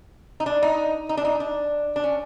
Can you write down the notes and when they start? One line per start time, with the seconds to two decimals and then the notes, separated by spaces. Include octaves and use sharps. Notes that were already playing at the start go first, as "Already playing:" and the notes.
0.40 D#4
0.46 D4
0.62 D#4
1.09 D#4
1.17 D4
1.25 D#4
1.40 D4
1.96 D4
2.04 C#4